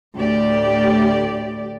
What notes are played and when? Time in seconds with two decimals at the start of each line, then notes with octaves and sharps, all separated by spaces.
0.16 D2 A2 G4 D5